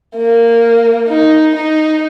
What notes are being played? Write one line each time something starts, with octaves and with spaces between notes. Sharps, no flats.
A#3
D#4
D#4